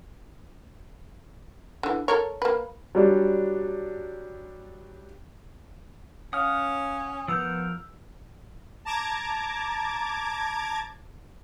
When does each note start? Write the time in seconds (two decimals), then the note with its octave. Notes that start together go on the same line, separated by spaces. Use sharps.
1.83 D3 E3
2.08 A4 A#4 C#5
2.42 A#3 B4
2.95 F#3 G3 D4
6.33 C#4 C#5 F5 F#5 D#6 F6
7.28 F3 B3 A#4 E6 G6
8.85 A5 A#5 D6 G#6 A6